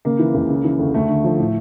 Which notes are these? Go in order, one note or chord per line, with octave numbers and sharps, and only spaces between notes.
C#3 A#3
E3
C#2
C#3
E3
D2
D2 A3
D3
F3
A2